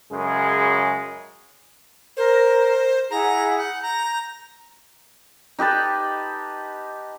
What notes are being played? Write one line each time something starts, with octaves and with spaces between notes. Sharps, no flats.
F#2 C#3 G#3
A#4 C5
E4 G#4 F#5 A#5
F#5 G6
A#5
D#4 G4 B4 A5